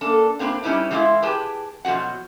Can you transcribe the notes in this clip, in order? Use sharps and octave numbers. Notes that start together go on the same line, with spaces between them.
A#3 D4 A4
A#3 C4 D4 F#4 B4
G3 C#4 D#4 E4 B4 C#5
E3 G3 G#3 A#3 E4 F4
G4 G#4 B4 G5 A5
B2 F3 F#3 F#4 F#5